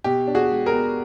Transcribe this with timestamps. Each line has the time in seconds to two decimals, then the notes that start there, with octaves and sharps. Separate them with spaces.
0.04 B2 G4
0.27 D4
0.35 F#4 G#4
0.51 G#3
0.66 G#4 A#4
0.73 B3